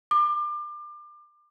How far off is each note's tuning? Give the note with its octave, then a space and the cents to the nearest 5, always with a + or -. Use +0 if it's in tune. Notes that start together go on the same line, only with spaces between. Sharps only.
D6 +30